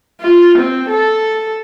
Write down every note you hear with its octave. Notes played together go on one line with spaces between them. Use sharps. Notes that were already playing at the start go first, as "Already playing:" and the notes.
F4
C4
A4